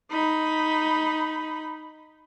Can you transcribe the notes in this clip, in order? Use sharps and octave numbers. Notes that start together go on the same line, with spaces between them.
D#4 B5